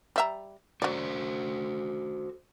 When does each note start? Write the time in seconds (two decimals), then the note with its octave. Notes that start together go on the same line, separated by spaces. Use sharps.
0.16 G3 E5 A#5
0.82 F#3 F#4 A4 C5 D5